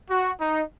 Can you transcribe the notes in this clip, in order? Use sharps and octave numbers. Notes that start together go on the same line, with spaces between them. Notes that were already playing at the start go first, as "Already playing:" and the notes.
F#4
D#4